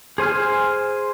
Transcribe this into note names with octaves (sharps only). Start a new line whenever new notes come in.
G#4 C5 G#5 F6